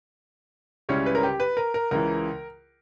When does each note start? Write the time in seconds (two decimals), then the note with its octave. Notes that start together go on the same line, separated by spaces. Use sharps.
0.89 C#2 C#3 G3 C#4 E4 C#5
1.06 B4
1.15 A#4
1.23 G4
1.40 B4
1.57 A#4
1.74 A#4
1.91 C#2 C#3 E3 A#4